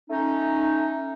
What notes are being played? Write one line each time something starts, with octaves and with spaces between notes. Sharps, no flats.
A3 C#4 D#4